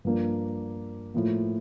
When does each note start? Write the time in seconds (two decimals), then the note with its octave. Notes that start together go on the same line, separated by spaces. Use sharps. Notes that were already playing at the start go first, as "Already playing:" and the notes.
0.05 G2 F3 A#3 D4
1.14 A2 F3 A#3